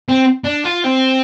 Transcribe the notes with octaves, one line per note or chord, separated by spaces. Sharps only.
C4
D4
F4
C4